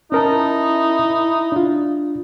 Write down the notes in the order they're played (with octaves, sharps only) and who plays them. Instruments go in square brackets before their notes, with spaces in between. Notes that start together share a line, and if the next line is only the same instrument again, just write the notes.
[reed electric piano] C#4 A#4 A5 [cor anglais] D#4 [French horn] E4
[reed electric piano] D4 F4